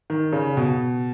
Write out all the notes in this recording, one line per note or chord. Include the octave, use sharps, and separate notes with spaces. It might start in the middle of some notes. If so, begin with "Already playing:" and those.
D#3
C#3
B2